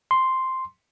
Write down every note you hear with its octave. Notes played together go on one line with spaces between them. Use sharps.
C6